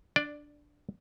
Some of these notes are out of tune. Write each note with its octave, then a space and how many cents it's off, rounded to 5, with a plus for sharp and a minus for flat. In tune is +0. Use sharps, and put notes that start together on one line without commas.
D4 +0 D5 +15